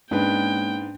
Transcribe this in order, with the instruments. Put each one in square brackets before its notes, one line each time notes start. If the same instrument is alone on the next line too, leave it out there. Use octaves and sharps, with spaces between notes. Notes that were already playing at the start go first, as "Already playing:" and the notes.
[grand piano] G#2 B4 [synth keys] G#3 A#3 C#4 [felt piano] D4 [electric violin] G5